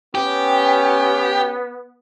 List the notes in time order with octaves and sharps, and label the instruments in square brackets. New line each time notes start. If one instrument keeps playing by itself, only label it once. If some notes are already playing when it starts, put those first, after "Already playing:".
[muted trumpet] B3 [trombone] C#4 [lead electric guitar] G4